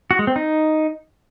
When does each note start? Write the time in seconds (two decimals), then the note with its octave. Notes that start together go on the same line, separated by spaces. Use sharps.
0.11 F#4
0.19 G#3
0.27 C4
0.36 D#4